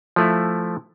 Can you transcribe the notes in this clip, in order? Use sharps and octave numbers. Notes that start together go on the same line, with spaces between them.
F3 A3 E4